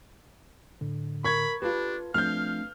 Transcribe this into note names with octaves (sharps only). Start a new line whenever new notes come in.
A2 D3
A#4 B5 C#6 G#6
D4 F4 G4 A4 B4
F3 A3 C4 D4 F5 F6 G6